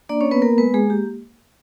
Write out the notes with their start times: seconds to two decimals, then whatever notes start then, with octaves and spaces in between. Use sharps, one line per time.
0.09 A#3 D4 D5
0.21 C#4 C#5
0.26 A#3
0.31 B3 B4
0.42 A#3 B3 A#4
0.58 G#3 B3 B4
0.74 G#3 A#3 G#4
0.90 A#3 G4